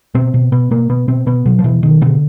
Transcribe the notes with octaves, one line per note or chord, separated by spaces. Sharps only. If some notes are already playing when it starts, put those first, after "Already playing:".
B2 C4
B2
B2 B3
B2 A#3
B2 B3
B2 C4
B2 B3
B2 F#3
F3
B2 E3
B2 D#3
B2 D3